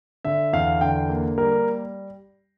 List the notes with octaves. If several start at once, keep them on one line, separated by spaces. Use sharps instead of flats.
D3 E5
E2 F5
D3 G5
A#3
G3 A#4